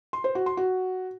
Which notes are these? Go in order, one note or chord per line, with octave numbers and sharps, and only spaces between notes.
C6
C5
F#4
C6
F#4